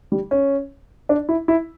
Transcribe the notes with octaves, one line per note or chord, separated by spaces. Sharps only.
G3
C#4
D4
E4
E4